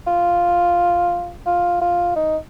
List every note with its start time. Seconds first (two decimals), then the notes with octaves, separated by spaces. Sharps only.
0.07 F4
1.46 F4
1.81 F4
2.16 D#4